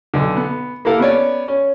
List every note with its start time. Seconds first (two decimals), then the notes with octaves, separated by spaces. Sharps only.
0.14 B1 D3
0.37 B3
0.85 A#3 E4 G4 A4 A#4 F5
1.00 B3 C#4 C#5 D5
1.48 C#4